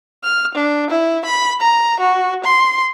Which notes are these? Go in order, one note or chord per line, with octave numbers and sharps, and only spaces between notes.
F6
D4
E4
B5
A#5
F#4
C6